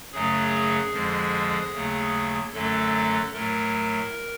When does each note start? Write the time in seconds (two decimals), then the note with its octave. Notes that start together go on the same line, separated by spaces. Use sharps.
0.12 F#2 C#3 F#3 A3 G#4
0.93 F2 D3 F3 G#3
1.74 D#2 C#3 F#3 A3
2.53 F#2 D3 F#3 A3 A4
3.33 A2 F#3 A3 A#4